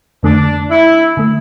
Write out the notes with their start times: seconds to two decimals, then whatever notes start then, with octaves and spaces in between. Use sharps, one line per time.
0.23 F2 D3 A3 D4
0.70 E4
1.17 D3 A3